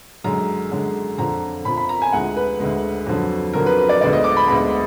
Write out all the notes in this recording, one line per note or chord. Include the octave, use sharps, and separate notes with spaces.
F#2 D3 G#3 A#5
F#2 D3 G#3
F2 D3 F3 A#5
F2 D3 F3 B5
B5
A#5
G#5
D2 D3 G#3 F#5
B4
D2 D3 G#3
F2 D3 F#3
F2 D3 F#3 A#4
B4
B4
D5
D2 D3 G#3 B3 D5
D#5
D6
B5
D2 D3 G#3 B3 B5